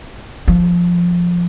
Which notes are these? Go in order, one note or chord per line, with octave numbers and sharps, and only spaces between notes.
F3